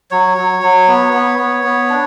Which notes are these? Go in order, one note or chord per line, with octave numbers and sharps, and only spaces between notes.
F#3 C#5
F#3
F#3
B3
B3
B3
B3
D4